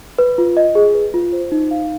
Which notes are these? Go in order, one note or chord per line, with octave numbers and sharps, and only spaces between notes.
B4
F4
D#5
G#4
B4
F4
C5
D#4
F5